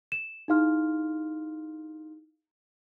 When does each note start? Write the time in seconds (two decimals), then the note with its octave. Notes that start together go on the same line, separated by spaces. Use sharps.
0.12 E7
0.48 D#4 E4 G#4 F5 C6 F6